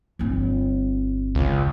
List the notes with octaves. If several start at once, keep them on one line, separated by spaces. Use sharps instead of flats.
G1 C4
C#2